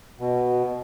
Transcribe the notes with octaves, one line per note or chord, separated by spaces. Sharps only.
B2